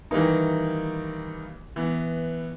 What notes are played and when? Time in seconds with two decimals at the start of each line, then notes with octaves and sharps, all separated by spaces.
0.11 D#3 E3 G3 A#3 D#4
1.76 E3 B3